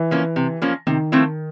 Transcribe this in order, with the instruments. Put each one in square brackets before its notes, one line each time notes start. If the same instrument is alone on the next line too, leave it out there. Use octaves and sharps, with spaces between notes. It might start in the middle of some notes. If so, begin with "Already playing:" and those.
Already playing: [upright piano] E3
[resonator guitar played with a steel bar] F3 A#3 C#4
C3
F3 A#3 C#4
[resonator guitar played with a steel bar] C3 [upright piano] D#3
[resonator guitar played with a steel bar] F3 A3 C4 E4